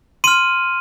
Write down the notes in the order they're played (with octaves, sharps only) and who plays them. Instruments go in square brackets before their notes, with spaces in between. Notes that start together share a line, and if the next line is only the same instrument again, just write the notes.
[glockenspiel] C6 F6 D#7